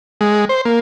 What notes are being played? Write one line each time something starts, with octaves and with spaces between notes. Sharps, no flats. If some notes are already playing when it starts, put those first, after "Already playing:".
G#3
C5
A#3